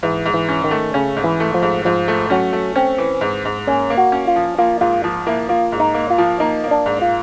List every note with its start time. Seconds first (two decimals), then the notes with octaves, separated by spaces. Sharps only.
0.03 G#2 E3
0.26 G#2
0.34 E3
0.49 C#4
0.64 D#3
0.71 A3
0.94 C#3 C#4
1.16 G#2
1.24 E3
1.40 A3
1.54 F3
1.62 G#2
1.85 G#2 F3
2.08 A3
2.30 F#3 C#4
2.53 A3
2.76 C4 C#4
2.98 E3
3.21 G#2
3.45 G#2
3.67 A#3 C#4
3.90 A#3
3.97 F#4
4.12 C#4
4.27 F4
4.36 F3
4.58 A#3 F4
4.81 G#2 F4
5.04 F3
5.27 A#3 E4
5.49 A#3 F4
5.72 G#2
5.80 D#4
5.94 A#3
6.10 F4
6.18 F3
6.40 A#3 D#4
6.64 A#3
6.71 D4
6.86 G#2
7.01 F4